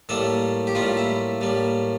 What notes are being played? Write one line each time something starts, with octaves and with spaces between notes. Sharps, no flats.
A2 G3 A#3 A4
G4
A2 G3 A#3 F4
E4
A2 G3 A#3